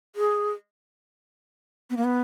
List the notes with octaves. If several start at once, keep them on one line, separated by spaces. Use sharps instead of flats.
G#4
B3
A#3
B3